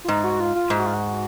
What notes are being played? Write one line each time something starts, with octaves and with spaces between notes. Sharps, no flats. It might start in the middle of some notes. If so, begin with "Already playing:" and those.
F4
G#2 D#4
F#4
F4
F4
G#2
F#4
F4
F#4